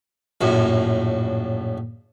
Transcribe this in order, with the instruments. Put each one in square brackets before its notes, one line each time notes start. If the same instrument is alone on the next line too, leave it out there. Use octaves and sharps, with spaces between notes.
[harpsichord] A#1 F#2 A2